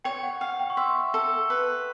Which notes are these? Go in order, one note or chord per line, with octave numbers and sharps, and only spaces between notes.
C#5 G5
F#5
F5 G5
G5
C#6
E5 C6
A4
B4